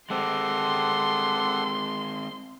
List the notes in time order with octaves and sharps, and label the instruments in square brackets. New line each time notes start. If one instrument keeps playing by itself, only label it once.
[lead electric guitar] G#3 C4 [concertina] G4 A4 F#5 [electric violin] C6